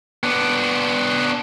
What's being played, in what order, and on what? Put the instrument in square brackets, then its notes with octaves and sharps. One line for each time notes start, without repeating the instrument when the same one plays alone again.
[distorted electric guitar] B3 D4